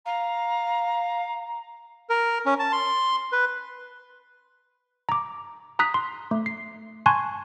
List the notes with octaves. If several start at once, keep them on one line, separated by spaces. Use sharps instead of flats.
F5 A#5
A#4
C#4
A5
C6
B4
A#5 D6
A#5 D#6 F#6 B6
C6
A3
C7
G#5 A5 C6 C#6 F#6 G#6